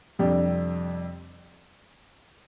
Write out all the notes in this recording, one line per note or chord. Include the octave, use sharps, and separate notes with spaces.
F2 C3 G3 D4 G4